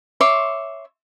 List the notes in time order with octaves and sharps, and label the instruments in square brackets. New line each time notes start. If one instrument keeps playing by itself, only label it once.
[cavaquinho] C#5 E5 C6 D6